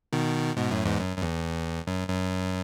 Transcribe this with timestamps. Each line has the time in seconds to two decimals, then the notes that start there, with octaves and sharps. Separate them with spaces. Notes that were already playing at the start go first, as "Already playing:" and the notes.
0.13 B2 D#3
0.57 G#2 B2
0.71 F#2 A2
0.85 E2 G#2
1.00 F#2
1.17 F#2
1.21 E2
1.87 F#2
2.08 F#2